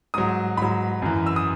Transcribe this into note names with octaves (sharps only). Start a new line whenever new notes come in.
G#2 F#3 D#6
G#2 F#3 B5
F#2 E3
E6
D#6